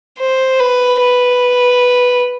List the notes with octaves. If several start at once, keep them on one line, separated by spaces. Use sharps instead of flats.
C5
B4
B4